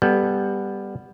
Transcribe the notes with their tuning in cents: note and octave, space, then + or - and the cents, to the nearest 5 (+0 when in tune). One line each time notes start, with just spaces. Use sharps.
G3 +15 B3 +0 A4 +0